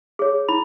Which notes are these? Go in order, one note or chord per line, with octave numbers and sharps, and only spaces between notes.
G#4 C#5
E4 B5